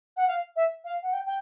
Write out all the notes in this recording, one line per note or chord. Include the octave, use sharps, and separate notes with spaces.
F#5
F5
E5
F5
F#5
G5
G5